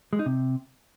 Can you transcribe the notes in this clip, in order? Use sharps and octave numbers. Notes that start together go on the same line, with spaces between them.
G#3
D#4
C3